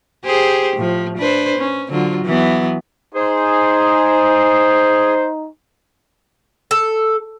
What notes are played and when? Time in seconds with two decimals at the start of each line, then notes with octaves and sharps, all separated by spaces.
0.25 G4 G#4 C5
0.76 A2 F3
1.18 D4 B4 C5
1.58 C#4
1.90 D3 F#3 F4
2.25 E3 F#3 B3
3.15 D#4 G#4 C5
6.71 A4